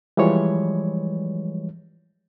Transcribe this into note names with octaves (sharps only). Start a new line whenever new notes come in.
E3 F3 G3 G#3 C#5